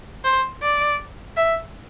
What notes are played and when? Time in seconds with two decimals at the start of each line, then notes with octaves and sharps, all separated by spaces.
0.25 C5
0.63 D5
1.37 E5